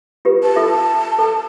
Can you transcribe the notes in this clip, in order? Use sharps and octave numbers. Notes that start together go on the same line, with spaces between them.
F4 G4 B4
A5
F4 A4 E5
A4